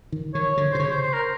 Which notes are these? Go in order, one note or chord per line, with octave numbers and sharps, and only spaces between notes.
D#3
D#3 C#5
D3
C5
C3
C#3 C#5
C5
C5
A#4